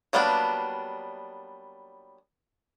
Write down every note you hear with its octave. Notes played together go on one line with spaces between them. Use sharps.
F#3 G3 A#3 B3 D4